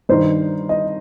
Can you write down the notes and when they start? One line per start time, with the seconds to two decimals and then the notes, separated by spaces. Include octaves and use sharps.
0.09 G2 D#3 C5
0.69 D#5